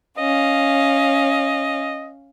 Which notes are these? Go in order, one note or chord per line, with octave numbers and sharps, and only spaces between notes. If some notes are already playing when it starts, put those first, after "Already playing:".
C#4 D#5 F5